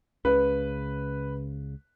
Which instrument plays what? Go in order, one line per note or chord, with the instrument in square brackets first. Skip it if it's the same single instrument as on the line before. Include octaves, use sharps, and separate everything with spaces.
[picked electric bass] C#2 C#3 [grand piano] B4